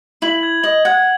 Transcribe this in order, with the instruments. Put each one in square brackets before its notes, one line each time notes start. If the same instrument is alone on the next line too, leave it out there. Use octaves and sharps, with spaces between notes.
[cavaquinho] E4 [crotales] F#7
[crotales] G#6
[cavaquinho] D#5 [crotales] F#7
[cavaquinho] F#5 [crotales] G#6